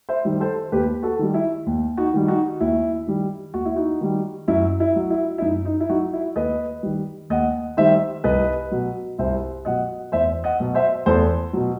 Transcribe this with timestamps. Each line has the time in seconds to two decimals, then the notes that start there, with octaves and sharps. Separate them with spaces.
0.09 C5 E5
0.25 D#3 G3
0.40 A4 C5
0.72 D#2 G4 B4
1.03 F#4 A4
1.19 D#3 G3
1.34 E4
1.66 D#2
1.97 D#4 F#4
2.14 D#3 G3
2.28 D#4 F#4
2.60 D#2 E4
3.07 D#3 G3
3.54 D#2 F#4
3.65 E4
3.76 D#4 F#4
4.01 D#3 G3
4.48 F#2 E4
4.80 E4
4.96 F#3
5.10 E4
5.38 E4
5.42 F#2 D#4
5.65 D#4
5.80 E4
5.89 F#3 D#4 F#4
6.13 E4
6.36 D#2 B4 D#5
6.83 D#3 G3
7.30 D#2 D#5 F#5
7.77 D#3 G3 C5 E5
8.24 C2 B4 D#5
8.71 B2 F#3
9.18 C2 C5 E5
9.65 B2 F#3 D#5 F#5
10.12 E2 C5 E5
10.44 D#5 F#5
10.60 B2 F#3
10.75 C5 E5
11.06 E2 A4 C5
11.53 B2 F#3